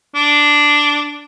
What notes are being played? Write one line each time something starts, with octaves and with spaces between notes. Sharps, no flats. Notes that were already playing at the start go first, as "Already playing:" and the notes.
D4